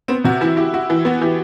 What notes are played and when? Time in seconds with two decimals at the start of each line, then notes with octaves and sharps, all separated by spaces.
0.08 B3 C4
0.24 C3 F#4
0.41 E3 E4
0.57 E4 G4
0.73 E4 F#4
0.90 E3
1.05 B3 F#4
1.21 E3 G4